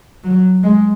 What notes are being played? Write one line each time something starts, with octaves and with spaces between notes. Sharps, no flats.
F#3
G#3